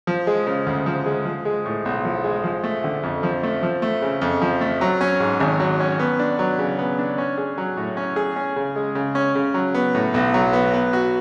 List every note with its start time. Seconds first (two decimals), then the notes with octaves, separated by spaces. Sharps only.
0.07 F3
0.27 G#3
0.47 C#3
0.66 D2
0.86 F3
1.06 G#3
1.25 F3
1.45 G#3
1.66 A2
1.85 B1
2.05 F3
2.24 G#3
2.44 F3
2.64 A3
2.84 D3
3.03 F2
3.23 F3
3.43 A3
3.63 F3
3.82 A3
4.02 C#3
4.21 F2
4.42 F3
4.61 A3
4.81 F#3
5.01 C#4
5.20 G#2
5.40 G#1
5.60 F#3
5.80 C#4
5.99 B3
6.19 D4
6.39 F#3
6.59 C#3
6.79 B3
6.99 D4
7.18 C#4
7.38 G#4
7.58 F#3
7.77 A2
7.97 C#4
8.16 G#4
8.36 C#4
8.56 C#3
8.76 G#3
8.95 C#3
9.15 C#4
9.35 C#3
9.54 F#3
9.74 B3
9.95 A2
10.14 B1
10.34 F#3
10.53 B3
10.73 B3
10.93 F#4